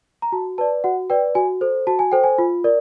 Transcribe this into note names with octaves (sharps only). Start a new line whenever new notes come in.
A#5
F#4 A5
B4 D5 A5
F#4 F#5
B4 D5 G5
F#4 G#5
A4 C5
F#4 A5
G#5
A4 C5 G5
G#5
F4
A#4 D5